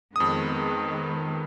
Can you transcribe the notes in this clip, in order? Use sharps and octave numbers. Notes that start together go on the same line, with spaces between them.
F2 D#3 G#3 B3 D#6